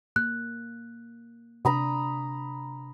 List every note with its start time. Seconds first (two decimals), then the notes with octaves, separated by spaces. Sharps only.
0.16 A#3 F#6
1.65 C3 D4 A#5 B5 D#6